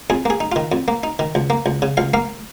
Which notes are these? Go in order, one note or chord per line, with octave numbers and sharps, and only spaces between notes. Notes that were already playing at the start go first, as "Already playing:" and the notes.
F2 G#4
A#3 G#4
D#4
D#3 F4
F2
A#3
D#4
D#3
C#2
A#3
C#2
C#3
C#2 F5
A#3 F5